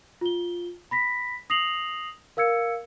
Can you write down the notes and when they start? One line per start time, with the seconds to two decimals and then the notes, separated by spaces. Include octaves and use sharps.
0.21 F4 G7
0.91 B5 A#6 B6
1.50 D#6 A#6 C7 F7 F#7
2.37 A#4 F5 E6 G#6 C#7